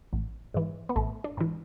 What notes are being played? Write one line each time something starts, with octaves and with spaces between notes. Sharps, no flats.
A1
G#2 E3
B3
A1 A3
D4
G#2 E3